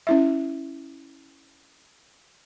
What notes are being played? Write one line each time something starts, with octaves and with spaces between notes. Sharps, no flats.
C#4 E4 E5